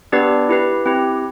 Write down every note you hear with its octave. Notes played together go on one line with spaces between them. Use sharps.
B3 D4 G4 B4 D5
E4 G4 B4
C4 E4 G4